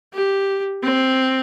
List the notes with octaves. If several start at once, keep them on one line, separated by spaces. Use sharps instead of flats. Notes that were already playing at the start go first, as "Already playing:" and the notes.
G4
C4